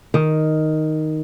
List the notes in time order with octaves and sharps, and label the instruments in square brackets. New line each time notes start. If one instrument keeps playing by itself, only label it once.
[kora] D#3